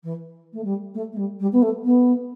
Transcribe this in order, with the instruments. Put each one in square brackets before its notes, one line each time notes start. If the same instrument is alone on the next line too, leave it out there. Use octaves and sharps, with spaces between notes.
[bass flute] E3
A3
G3
A3
A3
G3
G3
B3
A3
B3